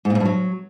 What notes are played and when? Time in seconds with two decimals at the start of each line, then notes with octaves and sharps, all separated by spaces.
0.05 G#2
0.10 A#2
0.15 G#2
0.20 G2
0.25 F#3